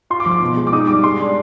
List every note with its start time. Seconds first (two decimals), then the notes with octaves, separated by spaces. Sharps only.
0.10 F4 C6
0.20 D6
0.26 F3
0.31 D6
0.42 B2
0.57 G#3
0.67 D6
0.73 D#4 D#6
0.87 G3 D6
1.04 G#3 C6
1.20 D4